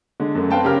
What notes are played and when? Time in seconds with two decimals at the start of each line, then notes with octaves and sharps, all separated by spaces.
0.20 D3 G#3
0.35 F#2 A3
0.51 C4 B4 F5 G5 A5
0.64 C#3 G4 A#4 F6